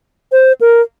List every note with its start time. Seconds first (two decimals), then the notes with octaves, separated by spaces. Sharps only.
0.32 C5
0.61 A#4